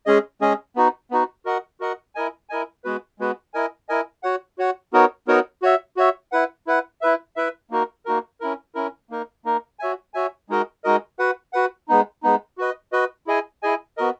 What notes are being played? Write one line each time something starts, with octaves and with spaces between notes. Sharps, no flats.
G#3 C#4 G#4 D#5
G#3 C#4 G#4 D#5
B3 D#4 F#4
B3 D#4 F#4
F#4 A#4 D#5 F#5
F#4 A#4 D#5 F#5
E4 A#4 D#5 G#5
E4 A#4 D#5 G#5
G#3 B3 F#4 B4
G#3 B3 F#4 B4
E4 A#4 D#5 G#5
E4 A#4 D#5 G#5
F#4 C#5 F#5
F#4 C#5 F#5
B3 D#4 F#4 A#4 C#5
B3 D#4 F#4 A#4 C#5
F#4 C#5 E5
F#4 C#5 E5
E4 B4 F#5
E4 B4 F#5
E4 B4 E5
E4 B4 E5
A#3 D#4 F#4 A#4
A#3 D#4 F#4 A#4
C#4 E4 A#4
C#4 E4 A#4
A#3 D#4 A#4
A#3 D#4 A#4
F#4 C#5 E5 G#5
F#4 C#5 E5 G#5
G#3 D#4 F#4 A#4 D#5
G#3 D#4 F#4 A#4 D#5
F#4 B4 F#5
F#4 B4 F#5
G#3 B3 D#4
G#3 B3 D#4
F#4 B4 D#5
F#4 B4 D#5
E4 G#4 D#5 G#5
E4 G#4 D#5 G#5
B3 F#4 A#4 D#5